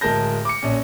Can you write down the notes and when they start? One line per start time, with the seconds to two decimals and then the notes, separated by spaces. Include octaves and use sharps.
0.01 D1 G#3 A#4 A5 G6 A#6
0.45 D6 C#7
0.63 A#1 C#4